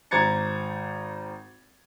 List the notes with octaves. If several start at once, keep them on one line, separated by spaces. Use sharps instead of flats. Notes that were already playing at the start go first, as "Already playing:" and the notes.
G#1 C5 A#5 G#6 A6 C#7